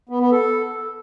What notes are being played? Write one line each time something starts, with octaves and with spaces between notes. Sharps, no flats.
B3
B3
A4